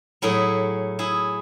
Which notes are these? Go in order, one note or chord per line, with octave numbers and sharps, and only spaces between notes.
A2 F#3 E4 G#4
E4 G#4